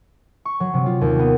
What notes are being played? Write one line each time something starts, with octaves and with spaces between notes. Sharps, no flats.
C#6
F#3
C3
F4
D#2
B3